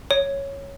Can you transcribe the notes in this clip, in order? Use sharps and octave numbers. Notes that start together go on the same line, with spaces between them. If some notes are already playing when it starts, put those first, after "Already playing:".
C#5